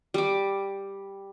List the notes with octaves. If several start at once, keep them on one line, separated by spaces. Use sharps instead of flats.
G3 D6